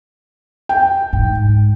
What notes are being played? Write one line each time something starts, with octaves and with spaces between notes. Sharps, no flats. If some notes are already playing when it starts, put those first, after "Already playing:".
G5
G#2